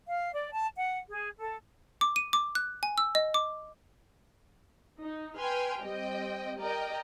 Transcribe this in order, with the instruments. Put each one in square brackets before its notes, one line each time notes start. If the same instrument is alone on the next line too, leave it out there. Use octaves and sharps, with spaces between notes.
[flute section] F5
D5
A5
F#5
G#4
A4
[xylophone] D6
D#7
D6
F#6
G#5
E6
D#5
D6
[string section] D#4
B4 G5 G#5 C6 F6
G3 C4 D#5 G5
A#4 D5 D#5 G5 A#5